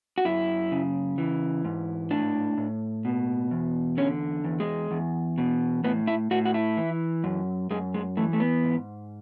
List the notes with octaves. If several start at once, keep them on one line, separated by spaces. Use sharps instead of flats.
F#4
F#2 E4
C#3
E3
G#2
A2 D4
A2
B2
E2
D3 C#4
E2
G#3
E2
B2
A2 B3
E4
A2 F#4
F#4
E4
E3
F#2
F#2 G#3
G#3
E3 A3
A3
B3
G#2